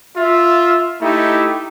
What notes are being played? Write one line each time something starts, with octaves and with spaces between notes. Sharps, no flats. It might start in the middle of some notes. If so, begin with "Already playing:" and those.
F4 E5
A3 D#4 E4 G4